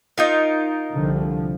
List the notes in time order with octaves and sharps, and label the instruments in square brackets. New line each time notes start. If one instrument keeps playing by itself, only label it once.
[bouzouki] D#4 F4 A#4
[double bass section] C2 D3 F3